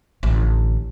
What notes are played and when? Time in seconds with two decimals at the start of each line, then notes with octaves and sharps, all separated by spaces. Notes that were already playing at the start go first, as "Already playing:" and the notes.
0.23 A1 D3